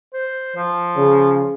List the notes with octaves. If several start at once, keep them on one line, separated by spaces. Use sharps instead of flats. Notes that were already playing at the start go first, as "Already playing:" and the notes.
C5
F3
C#3